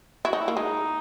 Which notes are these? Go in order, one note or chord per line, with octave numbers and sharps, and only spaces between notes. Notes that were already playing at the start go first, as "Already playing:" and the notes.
E4 F#4
D#4
E4
A#3
G#3 D#4